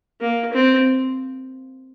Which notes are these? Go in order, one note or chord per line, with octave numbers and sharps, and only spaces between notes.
A#3
C4